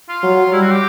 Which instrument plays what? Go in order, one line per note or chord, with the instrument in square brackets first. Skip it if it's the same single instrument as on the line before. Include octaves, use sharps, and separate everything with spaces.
[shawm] F4
[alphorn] F#3
[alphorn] G3 [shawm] E4
[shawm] F#4
G4